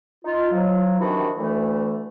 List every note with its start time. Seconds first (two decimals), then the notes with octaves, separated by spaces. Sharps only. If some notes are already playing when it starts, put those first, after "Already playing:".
0.24 D#4 F4
0.51 F3 F#3
0.99 C3 D#3 E3 D4 E4 F#4
1.37 D2 E3 A3